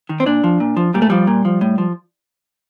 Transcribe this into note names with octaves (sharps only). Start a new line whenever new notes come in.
D#3
C4
A#2 D4
F3
A#2
F3
A#2 G3
A3
F3 G3
A#2
F3
A2
F3